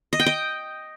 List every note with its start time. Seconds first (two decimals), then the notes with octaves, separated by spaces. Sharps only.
0.13 D#5
0.20 G5
0.26 D#5